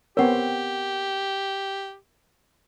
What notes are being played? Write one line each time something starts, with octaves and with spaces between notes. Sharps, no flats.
B3 C4 G4 A#4 C#5 F#5